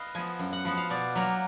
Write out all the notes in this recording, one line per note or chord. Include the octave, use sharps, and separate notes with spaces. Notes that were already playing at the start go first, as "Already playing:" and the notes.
Already playing: B4 D#5 F5
F3 B3 G#5
F#2
F#5
F3 B3 F#5
F5
B2 D5
F#3 A#3 A#4